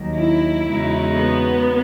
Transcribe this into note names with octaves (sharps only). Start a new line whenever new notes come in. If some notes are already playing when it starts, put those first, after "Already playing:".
Already playing: D#2 D#3 F#3
E4
E2 C#3 G#3 D#4 F#4
B3